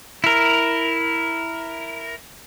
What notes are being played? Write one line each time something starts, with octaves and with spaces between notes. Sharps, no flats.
E4 A#4